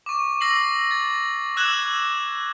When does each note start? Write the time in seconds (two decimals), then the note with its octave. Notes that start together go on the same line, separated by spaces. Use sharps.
0.06 C#6 D6
0.41 E6 A#6 C7 F#7
0.91 A6
1.56 D6 E6 F#6 G#6 E7 F#7